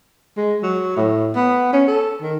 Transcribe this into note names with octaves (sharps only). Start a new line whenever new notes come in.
G#3
F#3
A2
B3
C#4
A4
D#3